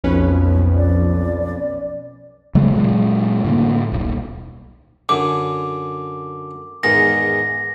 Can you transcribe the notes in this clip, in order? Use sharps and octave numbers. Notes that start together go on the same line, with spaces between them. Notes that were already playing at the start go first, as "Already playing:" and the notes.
B1 F2 C#4 B4
D5
C#3 F#3 G#3 A3
A#2 F#3 G#3
A2 D3 A#3
D#1 B1
F#2 D3 D6
E2 G#2 D#3 A#6